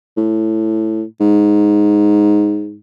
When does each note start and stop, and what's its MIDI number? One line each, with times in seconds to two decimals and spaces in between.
0.17 1.03 45
1.20 2.77 44